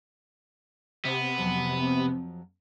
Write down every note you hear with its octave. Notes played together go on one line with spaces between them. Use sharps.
C3 B3
F2 F3 F#3
C4